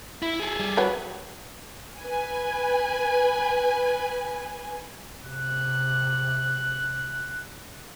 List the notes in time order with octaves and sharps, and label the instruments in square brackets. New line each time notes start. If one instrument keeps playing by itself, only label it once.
[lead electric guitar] E4
G#4 A4
[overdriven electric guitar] G3
[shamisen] F#4 C#5 G5 [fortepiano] B4
[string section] B4 G#5
[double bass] C3 [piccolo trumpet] F#6